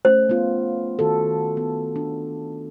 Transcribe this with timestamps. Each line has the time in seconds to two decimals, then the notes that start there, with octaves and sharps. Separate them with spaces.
0.05 A3 C#4 C5
0.29 B3 F4
0.99 D#3 F#4 A4
1.57 B3
1.96 D4